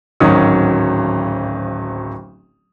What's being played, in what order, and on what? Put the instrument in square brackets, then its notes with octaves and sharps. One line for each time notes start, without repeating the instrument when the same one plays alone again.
[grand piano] D1 G#1 D#3 F#3 C#4 D#6